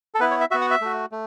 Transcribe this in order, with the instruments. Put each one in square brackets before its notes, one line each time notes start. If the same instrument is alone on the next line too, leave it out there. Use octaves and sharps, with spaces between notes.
[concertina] A4
B3 E4 B4
C#5
E5
B3 F#4 E5
F#5
E5
A3 F#4
A3